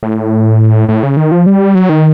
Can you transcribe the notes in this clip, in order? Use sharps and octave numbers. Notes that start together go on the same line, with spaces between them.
A2
A2
C#3
D#3
F3
G3
F#3
D#3